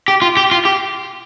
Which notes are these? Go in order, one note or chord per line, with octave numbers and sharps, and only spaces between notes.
G4
F4
G4
F4
G4